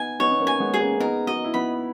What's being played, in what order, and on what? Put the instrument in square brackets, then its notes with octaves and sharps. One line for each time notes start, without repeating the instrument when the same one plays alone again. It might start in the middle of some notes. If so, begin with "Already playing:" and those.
Already playing: [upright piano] B3 D#4 [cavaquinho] G#5
[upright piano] B3 D#4 [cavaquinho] C#5
[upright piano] B3
A#3 C#4
[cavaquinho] G#5
[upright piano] G#3 B3
[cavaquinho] G#4
[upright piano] A#3 C#4
C#4
[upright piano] B3 D#4 [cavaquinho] A#4
[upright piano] D#4 F#4 [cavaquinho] D#5
[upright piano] E4
[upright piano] B3 D#4 [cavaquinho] B5